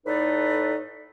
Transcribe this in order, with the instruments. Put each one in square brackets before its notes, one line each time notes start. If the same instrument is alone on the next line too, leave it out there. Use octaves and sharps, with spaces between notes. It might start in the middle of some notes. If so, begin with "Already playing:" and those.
[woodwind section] A2 D#4 A4 B4 D5